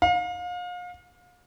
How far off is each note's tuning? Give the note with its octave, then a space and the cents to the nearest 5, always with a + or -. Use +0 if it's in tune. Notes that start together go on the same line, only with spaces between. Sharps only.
F5 +35